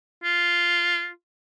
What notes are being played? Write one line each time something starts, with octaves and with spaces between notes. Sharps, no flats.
F4